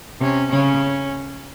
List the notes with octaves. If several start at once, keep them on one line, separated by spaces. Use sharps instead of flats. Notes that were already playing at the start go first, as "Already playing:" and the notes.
C3 C#4
C#3 C#4